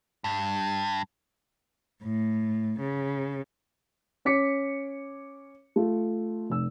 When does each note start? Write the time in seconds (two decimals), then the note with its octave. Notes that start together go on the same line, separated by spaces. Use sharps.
0.24 G2
2.02 A2
2.78 C#3
4.25 C#4 C#5 D6 B6 C#7
5.76 A3 F4
6.50 F1 E6